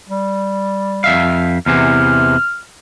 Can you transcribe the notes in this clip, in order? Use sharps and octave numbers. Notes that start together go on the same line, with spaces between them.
G3
F2 E5 F5
E2 C3 E3 F6